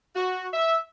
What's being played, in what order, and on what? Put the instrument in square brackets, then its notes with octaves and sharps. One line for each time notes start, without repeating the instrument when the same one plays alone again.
[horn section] F#4
E5